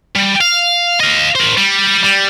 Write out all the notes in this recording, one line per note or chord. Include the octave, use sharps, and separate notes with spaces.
G3
F5
D#5 F5
A#4 C5
G3
G3